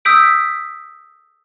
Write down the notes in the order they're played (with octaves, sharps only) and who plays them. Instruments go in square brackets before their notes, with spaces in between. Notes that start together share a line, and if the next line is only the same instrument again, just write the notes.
[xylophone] D#6 E6 G6 B6 D7